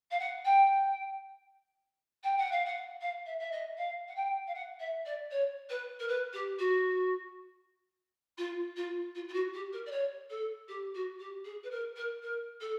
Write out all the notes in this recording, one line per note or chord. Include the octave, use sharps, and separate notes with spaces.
F5
F#5
G5
G5
F#5
F5
F#5
F5
E5
E5
D#5
F5
F#5
G5
F5
F#5
E5
D5
C#5
B4
A#4
B4
G4
F#4
F4
F4
F4
F4
F#4
G4
A#4
D5
C#5
A4
G4
F#4
G4
G#4
B4
A#4
A#4
A#4
A4